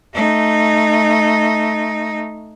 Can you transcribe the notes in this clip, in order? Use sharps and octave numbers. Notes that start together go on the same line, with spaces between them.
A3 D#4